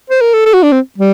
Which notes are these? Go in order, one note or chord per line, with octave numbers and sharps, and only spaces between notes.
C5
A#4
A4
A4
F#4
D4
C4
G3